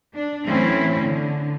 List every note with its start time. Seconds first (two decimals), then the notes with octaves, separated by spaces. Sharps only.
0.14 D4
0.45 A2 E3 F#3 C4 C#4 E4
1.02 D3